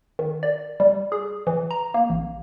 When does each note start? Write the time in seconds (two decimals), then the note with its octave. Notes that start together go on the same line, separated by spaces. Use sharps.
0.19 D#3
0.43 D5
0.80 G3
1.12 G#4
1.47 E3
1.71 A#5
1.94 A#3
2.10 A1